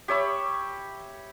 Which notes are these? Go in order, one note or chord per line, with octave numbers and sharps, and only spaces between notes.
G4 C#5 E5 B5